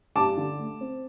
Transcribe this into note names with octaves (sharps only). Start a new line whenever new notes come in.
G2 A5 D6
D3
A3
C4